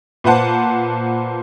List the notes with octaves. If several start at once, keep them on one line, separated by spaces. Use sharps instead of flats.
A#2 B4 C5 F#5 A5